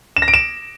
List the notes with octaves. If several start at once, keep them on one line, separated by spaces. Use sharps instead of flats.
E7
A#6
D7
E7